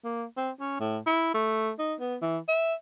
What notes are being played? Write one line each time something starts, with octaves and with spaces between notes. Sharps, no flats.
A#3
C4
C#4
A2
E4
A3
D#4
B3
E3
E5